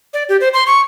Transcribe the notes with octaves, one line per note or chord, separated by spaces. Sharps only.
D5
G4
C5
C6
C#6